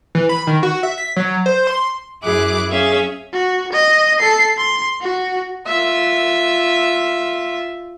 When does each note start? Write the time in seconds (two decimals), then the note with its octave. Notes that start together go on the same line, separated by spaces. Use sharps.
0.15 E3
0.29 B5
0.47 D#3
0.63 F#4
0.83 E5
0.98 B6
1.16 F#3
1.46 C5
1.67 C6
2.23 F#2 E4 G#4 D6 F#6
2.70 C#4 G#4 E5 F5
3.33 F#4
3.73 D#5
4.19 A4 C7
4.57 C6
5.01 F#4
5.67 F4 E5